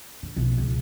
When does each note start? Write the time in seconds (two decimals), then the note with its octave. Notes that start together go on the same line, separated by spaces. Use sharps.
0.23 D3
0.36 B1
0.58 C#2